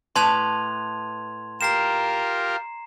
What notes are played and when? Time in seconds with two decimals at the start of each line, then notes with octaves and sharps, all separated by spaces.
0.16 A2 B4 A5 C6 G#6 F7
1.61 F4 G4 A#4 A#5 C7 E7